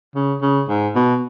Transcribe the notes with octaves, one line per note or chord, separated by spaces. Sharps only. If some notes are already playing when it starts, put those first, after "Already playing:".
C#3
C#3
G#2
B2